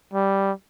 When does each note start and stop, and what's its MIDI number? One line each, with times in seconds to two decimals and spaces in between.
0.14 0.52 55